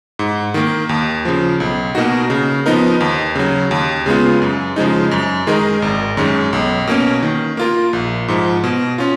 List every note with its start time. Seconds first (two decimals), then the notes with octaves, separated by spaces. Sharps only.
0.19 G#2
0.54 D#3 A#3
0.89 D#2
1.25 C#3 F3
1.60 B1
1.95 B2 A#3 D#4 F#4
2.30 C#3
2.66 F3 B3 D#4 A#4
3.01 D#2
3.35 C#3 F#3
3.71 D#2
4.06 C#3 G#3 B3 F4
4.42 F#2
4.76 C#3 F3 G#3 D#4
5.11 F#2
5.47 D#3 G#3 D#4 A#4
5.82 G#1
6.17 F#2 D#3 G#3 C#4
6.53 B1
6.87 B2 A#3 C#4
7.22 D#3
7.57 A#3 F4 A#4
7.93 A#1
8.28 G#2 F3
8.64 B2
8.98 C#4 F4